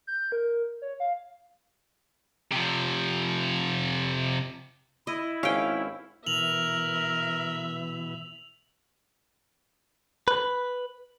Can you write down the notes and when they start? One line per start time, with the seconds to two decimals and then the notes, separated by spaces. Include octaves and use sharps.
0.07 G6
0.32 A#4
0.82 C#5
1.00 F5
2.52 C3 F3
5.07 E4 D#5
5.43 G#1 C#4 F5 G5
6.27 B2 E3 A#4 E5 F7 F#7
10.28 B4